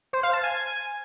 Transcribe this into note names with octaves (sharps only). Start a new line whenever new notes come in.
C5
F5
A5
G#5